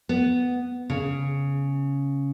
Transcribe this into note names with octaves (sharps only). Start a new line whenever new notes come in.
B3
C#3